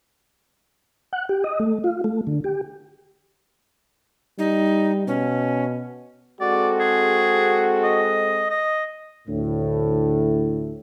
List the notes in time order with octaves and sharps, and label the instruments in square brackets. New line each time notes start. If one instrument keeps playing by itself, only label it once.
[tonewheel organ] F#5
G4
D#5
A3
F4
A3
D3
G4
[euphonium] G3 [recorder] D#4
[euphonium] B2 [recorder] C#4
[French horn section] G#3 C4 A4 [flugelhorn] F#4 [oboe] D5
[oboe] G#4
D#5
D#5
[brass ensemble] D2 A2